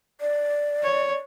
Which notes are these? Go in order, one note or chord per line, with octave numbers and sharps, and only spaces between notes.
D5
C#5